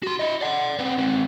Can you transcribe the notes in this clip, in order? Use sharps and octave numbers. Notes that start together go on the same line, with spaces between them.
F#4 C6
E4 D#5
D5 F#5
B3 C4
G#3 C4